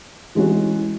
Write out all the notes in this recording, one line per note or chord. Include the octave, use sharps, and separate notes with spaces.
E3 G#3 C#4 F#4